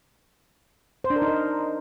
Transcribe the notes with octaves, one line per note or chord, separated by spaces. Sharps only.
C5
D4
A#4
D#4
A#4